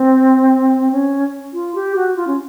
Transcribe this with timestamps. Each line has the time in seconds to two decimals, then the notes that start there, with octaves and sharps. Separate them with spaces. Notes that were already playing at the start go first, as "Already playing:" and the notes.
Already playing: C4
0.91 C#4
1.53 F4
1.75 G4
1.96 F#4
2.16 F4
2.27 C#4